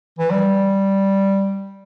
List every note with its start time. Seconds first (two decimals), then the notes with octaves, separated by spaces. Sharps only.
0.19 E3
0.30 G3